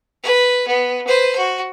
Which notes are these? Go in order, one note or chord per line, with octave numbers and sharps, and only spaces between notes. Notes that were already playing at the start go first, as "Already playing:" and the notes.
B4
B3
B4 C5
F#4